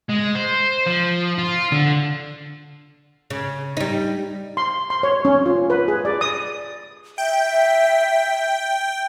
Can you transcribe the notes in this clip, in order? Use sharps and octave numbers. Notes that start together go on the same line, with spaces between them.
G#3
C5
F3
F4
D3
C#3
G3 D#4
C6
C6
C#5
C#4
F4
B4
G#4
D5
D#6
E5 G5